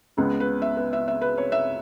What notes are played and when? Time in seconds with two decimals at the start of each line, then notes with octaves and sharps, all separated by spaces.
0.17 C#2 C#3 G#3 B3
0.40 B4
0.62 E5
0.77 B4
0.93 E5
1.08 E5
1.21 B4
1.38 C#5
1.52 E5